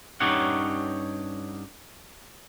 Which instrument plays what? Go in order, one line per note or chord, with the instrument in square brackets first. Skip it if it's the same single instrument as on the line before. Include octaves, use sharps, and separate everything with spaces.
[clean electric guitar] G2 C#4 D#4 G4 C#5 F#5